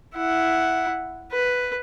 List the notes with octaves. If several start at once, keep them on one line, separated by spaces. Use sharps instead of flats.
E4 F#5
B4